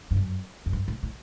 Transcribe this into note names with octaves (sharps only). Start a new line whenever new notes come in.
G2
F#2
F#2
G2
A2
A2